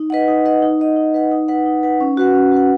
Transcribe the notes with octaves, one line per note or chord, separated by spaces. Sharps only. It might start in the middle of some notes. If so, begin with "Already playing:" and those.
Already playing: D#4
B4 D#5 F#5
D#4
B4 D#5 F#5
D#4
B4 D#5 F#5
D#4
B4 D#5 F#5
D#4
B4 F#5
D#4
B4 F#5
C#4
F#4 B4 F#5
C#4
F#4 B4 F#5